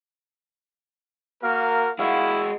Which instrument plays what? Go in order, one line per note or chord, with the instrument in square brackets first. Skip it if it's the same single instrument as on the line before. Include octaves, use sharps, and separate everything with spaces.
[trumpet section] A#3 F#4 A#4 [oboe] F5
[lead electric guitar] G#3 F#4 [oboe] E4 [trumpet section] F5